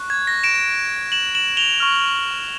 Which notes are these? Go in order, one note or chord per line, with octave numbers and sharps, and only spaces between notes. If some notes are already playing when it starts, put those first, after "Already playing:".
Already playing: C#6 F#6
G#6
A#6
D7 E7
E7 F#7
E7 F#7
F7 G7
C#6 F6